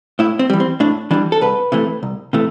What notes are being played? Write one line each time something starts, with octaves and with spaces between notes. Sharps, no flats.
A2 E4
C4
E3 G3
C4
A2 D4
E3 G3 D4
A4
C2 B4
C3 E3 A3
C2
C3 E3 A3